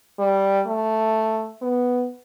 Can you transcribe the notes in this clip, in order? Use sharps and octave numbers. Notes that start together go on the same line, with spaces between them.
G3
A3
B3